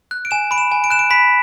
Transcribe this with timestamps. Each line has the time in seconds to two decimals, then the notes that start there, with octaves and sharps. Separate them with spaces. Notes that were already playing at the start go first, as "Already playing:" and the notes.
0.11 F#6
0.25 D7
0.31 G#5 E7
0.51 B5 D7
0.58 E7
0.72 G#5
0.84 D7
0.90 F#6 E7
0.99 D7
1.10 B5 B6